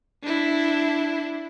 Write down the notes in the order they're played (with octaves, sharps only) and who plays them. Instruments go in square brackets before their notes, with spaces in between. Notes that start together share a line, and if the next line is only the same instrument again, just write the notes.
[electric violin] D4 E4